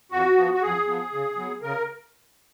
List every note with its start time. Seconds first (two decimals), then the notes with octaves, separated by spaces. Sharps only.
0.12 F2 F#4
0.37 F3 B3
0.54 F#4
0.62 F2 G#4
0.88 F3 B3
1.13 C#3
1.37 F#3 B3
1.62 C#3 A#4